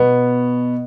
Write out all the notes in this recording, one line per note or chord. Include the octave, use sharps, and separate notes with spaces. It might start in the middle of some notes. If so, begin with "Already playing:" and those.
Already playing: B2 B3